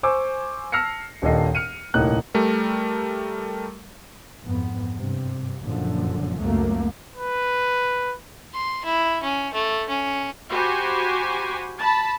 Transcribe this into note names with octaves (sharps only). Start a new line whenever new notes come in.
C5 G#5 C#6 D6 E6
A5 E6 F6 A#6 C7 C#7
D#1 D#2 D4 A4 D#5 C7
F6 C#7 D#7
D#1 C2 A2 A#3 D#4 F#6
G3 A3 A#4
F2 G#2 B3
G2 C3
F#1 F#2 A#2 D3 F3
C#2 F#2 F#3 A3 A#3
B4
C6
E4
C#4
A3
C#4
F#4 G4 C5 G#5 B5
A5 B5